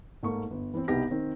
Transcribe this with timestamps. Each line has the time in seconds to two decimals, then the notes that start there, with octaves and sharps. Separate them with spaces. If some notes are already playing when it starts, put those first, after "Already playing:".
0.23 G#2 A3 A#3 C#6
0.51 G1
0.74 E3 C4
0.88 C2 B2 B3 D#4 G4 A#6
1.11 D#3 C4